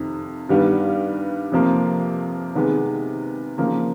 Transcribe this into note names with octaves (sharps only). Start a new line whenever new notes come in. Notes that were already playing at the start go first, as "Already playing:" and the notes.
Already playing: F2 C3 D#3
G2 D#3 G3 B3 D4
F2 C3 F3 A#3
C3 D#3 G#3 B3
C#3 F3 A#3